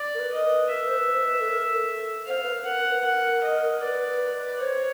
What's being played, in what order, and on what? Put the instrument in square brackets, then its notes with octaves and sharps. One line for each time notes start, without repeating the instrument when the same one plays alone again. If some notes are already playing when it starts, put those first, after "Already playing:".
Already playing: [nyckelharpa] D5
[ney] A#4
B4
[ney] A#4 [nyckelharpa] D#5
[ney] B4
[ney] A#4 [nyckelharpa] E5
[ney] C5
B4
C5
B4
A4
A#4
A4
[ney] C5 [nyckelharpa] F5
[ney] B4
A#4
[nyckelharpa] F#5
[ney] A#4
B4
[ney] A#4 [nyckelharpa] F#5
[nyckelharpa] D#5
[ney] B4 [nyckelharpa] D5
[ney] B4
B4
[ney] C5 [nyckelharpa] C#5